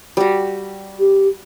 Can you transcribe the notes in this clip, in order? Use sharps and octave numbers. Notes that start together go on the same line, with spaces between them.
G3 F#4
G4